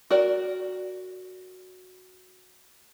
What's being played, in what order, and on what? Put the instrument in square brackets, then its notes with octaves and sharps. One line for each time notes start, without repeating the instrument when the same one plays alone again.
[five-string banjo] F#4 A#4 D5